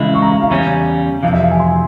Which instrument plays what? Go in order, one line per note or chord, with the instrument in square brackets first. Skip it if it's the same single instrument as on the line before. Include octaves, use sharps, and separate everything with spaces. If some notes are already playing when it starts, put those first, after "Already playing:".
Already playing: [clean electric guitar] C#3 E3 G#3 E4 [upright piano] E5
[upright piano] C#6
A#5
F5
F5
[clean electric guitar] E2 C#3 G3 C#4
[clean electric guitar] F2 C3 E3 [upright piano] F5
[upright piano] E5
F5
G#5
C6